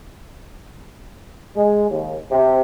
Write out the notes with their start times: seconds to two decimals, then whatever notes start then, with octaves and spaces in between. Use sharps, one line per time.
1.56 G#3
1.89 D#2
2.31 C3